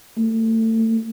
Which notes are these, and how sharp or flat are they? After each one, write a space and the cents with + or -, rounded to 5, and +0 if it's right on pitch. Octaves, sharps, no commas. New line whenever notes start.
A3 +30